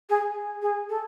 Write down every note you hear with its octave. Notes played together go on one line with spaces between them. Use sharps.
G#4
G#4
A4